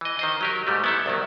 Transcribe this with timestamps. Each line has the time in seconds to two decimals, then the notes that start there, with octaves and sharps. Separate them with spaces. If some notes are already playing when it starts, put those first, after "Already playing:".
0.01 E3 D#5
0.19 D#3 C5 D#5
0.41 F#3 G4 A#4
0.67 G#2 G3 A3
0.84 B3 E4 A4
1.06 C2 D#3 F#3